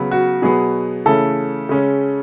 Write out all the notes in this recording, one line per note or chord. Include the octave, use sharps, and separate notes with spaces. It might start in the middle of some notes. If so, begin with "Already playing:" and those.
Already playing: C#3 F#3 B3
F#4
B2 F#3 B3 G#4
C#3 E3 A3 C#4 A4
C#3 G#3 C#4